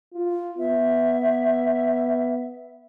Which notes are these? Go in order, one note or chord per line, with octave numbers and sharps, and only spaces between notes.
F4
B3 E5